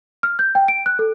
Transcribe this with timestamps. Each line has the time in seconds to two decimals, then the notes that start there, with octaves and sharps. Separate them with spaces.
0.23 F6
0.39 G6
0.55 G5
0.68 D7
0.86 F#6
0.99 A4